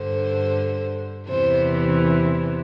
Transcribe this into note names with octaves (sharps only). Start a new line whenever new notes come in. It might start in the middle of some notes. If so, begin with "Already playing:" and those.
Already playing: G2 D3 C5
E2 C3 E3 C5